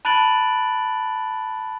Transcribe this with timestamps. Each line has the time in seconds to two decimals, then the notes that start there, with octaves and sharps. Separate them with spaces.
0.05 A5 B5 F#6 A6 D7 F#7